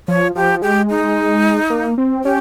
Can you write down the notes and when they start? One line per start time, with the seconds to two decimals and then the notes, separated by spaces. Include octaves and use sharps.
0.08 F3 C#5
0.35 F3 G4
0.62 G#3 G4
0.90 D#4
1.70 A#3
1.98 C4
2.24 C#4 G4